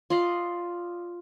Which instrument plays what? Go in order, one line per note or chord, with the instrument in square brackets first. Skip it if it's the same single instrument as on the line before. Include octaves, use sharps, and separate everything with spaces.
[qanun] F4 D5 D#5 F5